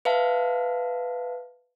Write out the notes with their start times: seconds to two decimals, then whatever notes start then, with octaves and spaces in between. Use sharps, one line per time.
0.05 B4 E5 F5 A5